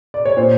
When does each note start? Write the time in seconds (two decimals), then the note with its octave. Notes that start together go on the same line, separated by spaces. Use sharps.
0.14 D5
0.25 C#5
0.37 A#2 C5